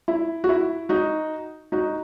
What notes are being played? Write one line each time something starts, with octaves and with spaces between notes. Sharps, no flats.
E4
F#4
E4
D#4 F#4
D#4 F#4